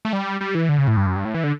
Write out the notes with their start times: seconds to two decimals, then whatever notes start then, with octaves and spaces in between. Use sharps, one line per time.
0.05 A3
0.13 G3
0.41 G3
0.55 E3
0.69 D3
0.78 C#3
0.88 A2
0.97 G2
1.06 F#2
1.16 G2
1.25 A2
1.35 E3
1.44 D3